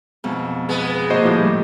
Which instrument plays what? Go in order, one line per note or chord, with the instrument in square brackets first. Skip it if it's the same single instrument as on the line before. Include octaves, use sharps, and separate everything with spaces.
[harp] F2 G#2 B2
[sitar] G#3 B3
[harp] A#2 D3 [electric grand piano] F#4 C5 D#5
[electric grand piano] A2 F3 A#3 [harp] G4 D#5
[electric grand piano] G3 A3